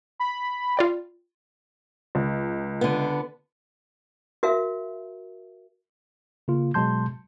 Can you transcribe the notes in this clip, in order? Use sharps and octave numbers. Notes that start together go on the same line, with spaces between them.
B5
F4 D5 G5
C#2
D3 B3
F#4 A#4 E5 F5
C#3 A#3 F4
B2 F#3 G#3 A5 C6 G6